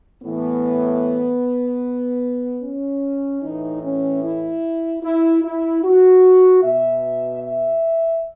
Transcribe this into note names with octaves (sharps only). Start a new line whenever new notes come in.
A2 E3 B3
C#4
A2 E3 D#4
C#4
E4
E4
E4
F#4
B2 E5
E5